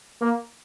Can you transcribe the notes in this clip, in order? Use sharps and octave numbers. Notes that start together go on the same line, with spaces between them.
A#3